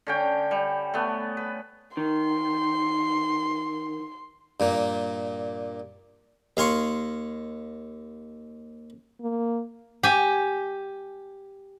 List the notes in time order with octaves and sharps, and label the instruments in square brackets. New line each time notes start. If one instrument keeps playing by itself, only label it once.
[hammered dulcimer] D3 C#4 G5
G3
A3 B3
B4
[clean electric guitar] D#3 [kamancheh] C6
[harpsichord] G2 A#2 A#3
D#2 F5 G#5 C6 C#6
[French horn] A#3
[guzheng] G4 G#5